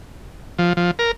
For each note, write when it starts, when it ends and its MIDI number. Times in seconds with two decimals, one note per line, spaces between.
0.59 0.73 53
0.77 0.91 53
0.99 1.11 70